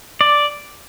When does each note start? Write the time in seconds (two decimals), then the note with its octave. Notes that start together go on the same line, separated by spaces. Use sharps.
0.21 D5